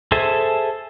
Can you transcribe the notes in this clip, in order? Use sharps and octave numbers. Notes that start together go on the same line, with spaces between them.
G#4 A4 C5 E5 G#5